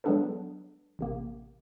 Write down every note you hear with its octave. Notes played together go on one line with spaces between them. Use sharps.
F#3 G#3 B3 D4 A4 B4
A1 C3 A#3